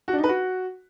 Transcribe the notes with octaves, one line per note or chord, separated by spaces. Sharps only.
F#4
D4
D#4
B4
F#4